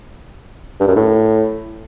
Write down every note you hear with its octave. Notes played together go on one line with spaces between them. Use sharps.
G2
F#2
A2